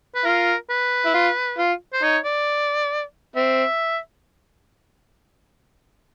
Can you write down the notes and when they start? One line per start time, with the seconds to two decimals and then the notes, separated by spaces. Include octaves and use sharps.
0.15 B4
0.25 F4 A#4
0.70 B4
1.06 E4
1.14 F4
1.58 F4
1.93 C5
2.03 D#4 C#5
2.24 D5
3.36 C4 E5